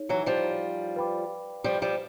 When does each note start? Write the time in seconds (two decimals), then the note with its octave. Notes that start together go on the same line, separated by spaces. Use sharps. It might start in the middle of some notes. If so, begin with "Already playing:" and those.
Already playing: D#4 G#4 C#5
0.09 E3 F#3
0.26 F3 G3
0.96 B4 D5 G5 B5 D6
1.64 F3 G3
1.82 F3 G3